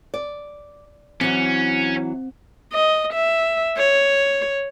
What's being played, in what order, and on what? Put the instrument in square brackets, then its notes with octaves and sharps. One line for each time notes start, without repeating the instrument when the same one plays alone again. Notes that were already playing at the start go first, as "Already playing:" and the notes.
[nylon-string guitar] D5
[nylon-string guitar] E3 F#3 [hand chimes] C4 [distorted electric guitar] C#4
[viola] D#5
E5
C#5